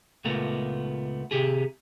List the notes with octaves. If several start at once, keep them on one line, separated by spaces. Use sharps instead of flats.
C#2 A#2 A3 B3 A#4
C3 G4 G#4